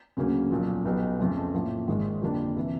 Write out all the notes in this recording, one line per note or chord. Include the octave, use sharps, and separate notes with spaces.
D2 C#3 F#3 A#3 C#4
B1 A#2 F3
B1 B2 G3 B3 D#4
F2 C#3 F3 A3 C#4
A2 F3 A#3
G#1 G#2 D#3 G#3
F2 D3 G3 A#3 D4
C3 E3